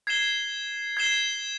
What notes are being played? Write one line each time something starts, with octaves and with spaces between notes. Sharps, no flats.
G#6 C7 E7 G7
G#6 C7 E7 G7